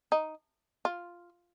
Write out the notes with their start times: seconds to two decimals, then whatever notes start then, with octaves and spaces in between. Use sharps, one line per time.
0.12 D#4
0.85 F4